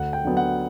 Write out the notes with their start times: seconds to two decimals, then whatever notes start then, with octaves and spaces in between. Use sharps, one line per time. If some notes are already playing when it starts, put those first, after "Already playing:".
Already playing: D2 F#5
0.13 G5
0.25 D3 F#3 B3
0.37 F#5